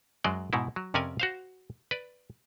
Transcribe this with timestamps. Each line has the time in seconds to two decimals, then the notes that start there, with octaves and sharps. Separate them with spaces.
0.24 F#2 F#3 G#3 D5 D#5
0.53 G#2 B2 D#4 E4
0.76 F#3
0.94 F2 C3 C#4 A#4 D5 G#5
1.20 F#4 C5 F5
1.91 B4 D5